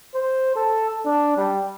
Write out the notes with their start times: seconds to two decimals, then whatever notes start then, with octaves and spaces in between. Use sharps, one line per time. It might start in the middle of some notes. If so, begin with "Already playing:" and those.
0.15 C5
0.56 A4
1.05 D4
1.37 G3